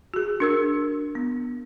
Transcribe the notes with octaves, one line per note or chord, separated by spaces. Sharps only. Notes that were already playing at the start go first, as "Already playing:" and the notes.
F#4 G#4
D4 A#4 E6
B3